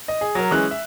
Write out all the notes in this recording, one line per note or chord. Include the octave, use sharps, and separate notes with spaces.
D#5
G#4
F#3 A#4
E3 G#3 C#4 F#6
E5